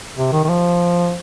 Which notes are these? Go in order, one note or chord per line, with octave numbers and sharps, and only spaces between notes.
C3
D#3
D#3
F3